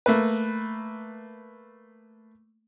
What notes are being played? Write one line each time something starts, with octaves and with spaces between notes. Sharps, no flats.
A3 A#3 B4